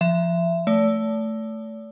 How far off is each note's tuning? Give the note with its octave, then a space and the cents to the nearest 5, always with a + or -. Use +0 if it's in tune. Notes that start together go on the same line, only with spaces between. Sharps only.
F3 -20 E5 +20
A3 +0 D5 -40